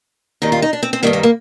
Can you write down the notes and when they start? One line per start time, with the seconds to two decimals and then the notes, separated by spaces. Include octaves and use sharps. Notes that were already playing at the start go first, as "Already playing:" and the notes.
0.42 D#2 D#3 G3 D#4
0.52 F4
0.62 D#4
0.73 D4
0.83 C4
0.93 C4
1.03 G2 D#3 G3 A#3
1.13 A#3
1.23 A#3